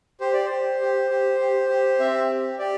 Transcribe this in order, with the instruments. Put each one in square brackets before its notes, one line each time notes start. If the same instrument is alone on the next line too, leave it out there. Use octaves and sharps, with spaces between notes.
[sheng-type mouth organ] G4 C5
D5
C5
G4
G4
G4
G4
G4
C4 E5
G4
G4 D5